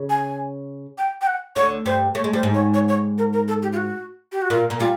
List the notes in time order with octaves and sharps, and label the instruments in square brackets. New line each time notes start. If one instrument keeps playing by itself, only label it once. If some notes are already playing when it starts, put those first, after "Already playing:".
Already playing: [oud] C#3
[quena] G#5
G5
G5
F#5
[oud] D2 D3 [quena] C#5
[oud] G2 G3 [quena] C5
[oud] A3 [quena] C#5
[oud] G#3
[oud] G3 [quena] C5
[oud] G#2 G#3
[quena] C#5
C#5
C#5
A#4
A#4
A4
G4
F4
F#4
G4
F#4
[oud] A#2 A#3 [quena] F4
[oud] A#2 A#3
[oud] G3 [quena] F4